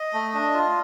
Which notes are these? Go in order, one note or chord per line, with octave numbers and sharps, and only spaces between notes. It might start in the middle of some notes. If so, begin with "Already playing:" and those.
Already playing: D#5
A3
D4
F4